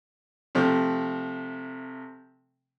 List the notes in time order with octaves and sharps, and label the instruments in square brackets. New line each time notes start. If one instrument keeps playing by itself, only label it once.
[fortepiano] C3 F3 A3